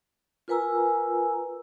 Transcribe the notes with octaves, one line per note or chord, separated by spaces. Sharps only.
F4 A#4 B4 G#5 A#5 E6